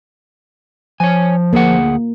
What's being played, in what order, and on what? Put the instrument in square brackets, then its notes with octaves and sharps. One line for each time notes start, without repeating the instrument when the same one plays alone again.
[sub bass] F3 [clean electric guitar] C#5 G#5
[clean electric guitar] D2 G#4 F#5 [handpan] A#3